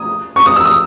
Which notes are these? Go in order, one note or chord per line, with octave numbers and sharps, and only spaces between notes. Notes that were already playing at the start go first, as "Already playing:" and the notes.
Already playing: D#6
C#6
D#6
E6
D#6